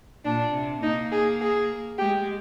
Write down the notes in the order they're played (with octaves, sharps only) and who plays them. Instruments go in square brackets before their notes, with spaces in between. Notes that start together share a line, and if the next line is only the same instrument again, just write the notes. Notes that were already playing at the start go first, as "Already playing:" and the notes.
[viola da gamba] A#2 [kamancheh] D4
[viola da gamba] C3
[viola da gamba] A#3 [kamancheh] D#4
[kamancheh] G#4
G#4
[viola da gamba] G#3 [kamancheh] G4